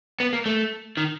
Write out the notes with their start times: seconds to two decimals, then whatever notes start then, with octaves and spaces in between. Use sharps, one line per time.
0.20 B3
0.33 A#3
0.46 A3
0.97 D#3